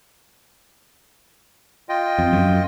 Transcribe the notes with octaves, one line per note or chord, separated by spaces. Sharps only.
F4 D#5 G5
F2
F#2